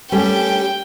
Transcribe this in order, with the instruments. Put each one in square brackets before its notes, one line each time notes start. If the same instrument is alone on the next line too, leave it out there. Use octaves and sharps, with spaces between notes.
[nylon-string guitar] G3 A3 C#4 [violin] G5